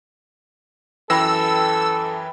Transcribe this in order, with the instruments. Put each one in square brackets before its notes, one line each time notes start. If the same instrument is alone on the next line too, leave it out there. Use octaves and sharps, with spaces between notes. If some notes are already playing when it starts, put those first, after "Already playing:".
[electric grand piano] F#2 E3 A#6 [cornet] A4 [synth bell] B4 G5 B5 [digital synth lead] E6